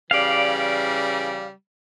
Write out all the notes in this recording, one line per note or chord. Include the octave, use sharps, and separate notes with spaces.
C#3 E3 G3 D5 F5